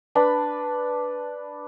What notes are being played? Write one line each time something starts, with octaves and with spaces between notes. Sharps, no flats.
D4 B4 B5